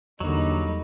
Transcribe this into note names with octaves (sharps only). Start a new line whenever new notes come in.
E2 D3 F#3 G3 A#3 D#4